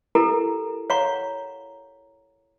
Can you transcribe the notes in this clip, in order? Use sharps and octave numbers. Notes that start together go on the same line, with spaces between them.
E4 G4 A4 A#4 A#5
C#5 F5 F#5 A#5 C#6